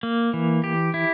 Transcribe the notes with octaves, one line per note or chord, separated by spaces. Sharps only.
A#3
E3
G4
E4